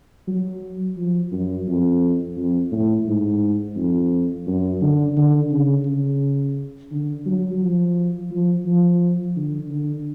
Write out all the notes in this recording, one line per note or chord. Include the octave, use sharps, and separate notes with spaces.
F#3
F3
F#2
F2
F2
A2
G#2
F2
F#2
D3
D3
C#3
C#3
D3
F#3
F3
F3
F3
D3
D3